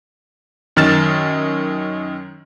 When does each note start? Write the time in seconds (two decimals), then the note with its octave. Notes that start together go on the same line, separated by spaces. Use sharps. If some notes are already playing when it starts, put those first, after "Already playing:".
0.76 F#2 D#3 F6 A6 E7